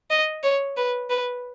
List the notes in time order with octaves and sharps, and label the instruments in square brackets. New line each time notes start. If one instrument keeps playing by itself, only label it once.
[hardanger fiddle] D#5
C#5
B4
B4